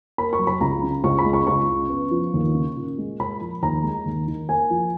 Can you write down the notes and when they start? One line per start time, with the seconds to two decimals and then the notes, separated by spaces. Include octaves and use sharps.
0.18 A#3 B5
0.33 C#6
0.39 F#3
0.47 B5
0.60 C#2 A#5
0.83 C#3
1.04 C#2 C#6
1.18 B5
1.25 G#3
1.33 C#6
1.47 C#2 C#6
1.68 C#3
1.90 B3
2.11 F3
2.34 D#2
2.54 C#3
2.77 A#2
2.98 G#3
3.20 A#2 B5
3.41 F3
3.62 D#2 A#5
3.84 G#3
4.05 D#2
4.28 D#3
4.48 A#3 G#5
4.70 F3